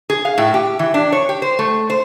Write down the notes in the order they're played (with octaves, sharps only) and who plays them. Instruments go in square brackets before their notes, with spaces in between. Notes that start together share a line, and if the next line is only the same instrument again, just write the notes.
[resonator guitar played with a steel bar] G#4
F5
A2
G4
E3
D4
C#5
G4
C5
A3
C5